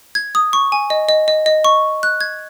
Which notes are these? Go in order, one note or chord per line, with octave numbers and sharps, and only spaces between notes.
G#6
D#6
C#6
G#5
D#5
D#5
D#5
D#5
C#6
F#6
G#6